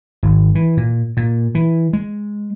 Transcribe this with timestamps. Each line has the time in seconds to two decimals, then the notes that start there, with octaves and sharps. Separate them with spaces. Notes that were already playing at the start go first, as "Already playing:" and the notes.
0.23 G#1
0.55 E3
0.77 A#2
1.17 A#2
1.55 E3
1.93 G#3